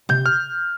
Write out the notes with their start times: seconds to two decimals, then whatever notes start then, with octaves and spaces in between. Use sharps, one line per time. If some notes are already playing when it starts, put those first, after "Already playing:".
0.09 C3 G6
0.26 F6